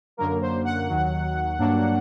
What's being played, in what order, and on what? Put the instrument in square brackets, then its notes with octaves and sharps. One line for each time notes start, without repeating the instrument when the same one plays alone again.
[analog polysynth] F#2 D3 F#3 A#3 A#4
C5
F#5
D#2 D#3 F#3
G2 F#3 A#3 D4